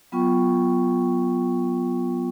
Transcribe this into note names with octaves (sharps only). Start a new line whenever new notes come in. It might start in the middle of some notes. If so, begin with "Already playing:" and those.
F#3 B3 F4 G5 C#6